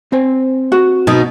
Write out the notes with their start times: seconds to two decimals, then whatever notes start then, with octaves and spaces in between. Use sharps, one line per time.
0.12 C4 C5 G#5
0.72 F#4
1.07 B2 B3 D#4